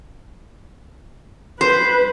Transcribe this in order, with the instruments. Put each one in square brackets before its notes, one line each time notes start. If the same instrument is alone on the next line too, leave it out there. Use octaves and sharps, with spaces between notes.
[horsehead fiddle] B4 [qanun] C5